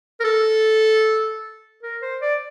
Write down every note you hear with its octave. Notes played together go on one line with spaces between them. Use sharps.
A#4
A4
A#4
C5
D5